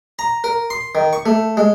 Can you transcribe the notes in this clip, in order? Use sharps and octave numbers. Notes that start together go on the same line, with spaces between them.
A#5
A#4
C6
D#3
C#6
A3
G#3